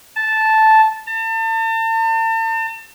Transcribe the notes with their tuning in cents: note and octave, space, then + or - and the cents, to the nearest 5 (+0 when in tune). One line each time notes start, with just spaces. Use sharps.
A5 -5
A5 +40